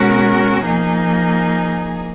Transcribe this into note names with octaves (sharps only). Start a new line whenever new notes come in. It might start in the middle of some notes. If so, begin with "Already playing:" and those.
Already playing: B2 G#3 C#4 F#4 A#4
F3 A#3 D#4 G#4